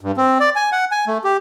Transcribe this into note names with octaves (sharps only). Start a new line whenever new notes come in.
G2
C4
D5
G#5
F#5
G#5
A3
G4